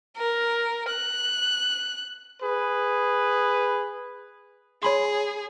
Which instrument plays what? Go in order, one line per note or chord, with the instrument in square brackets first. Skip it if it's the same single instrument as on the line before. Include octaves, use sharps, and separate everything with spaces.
[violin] A#4
F#6
[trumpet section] G#4 B4
[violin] G#4 [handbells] C#5 B5 C6